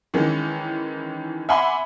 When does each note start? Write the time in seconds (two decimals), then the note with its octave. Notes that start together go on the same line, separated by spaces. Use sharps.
0.14 D#3 E3 G#3 C#4
1.49 E5 F#5 G#5 B5 C6 D6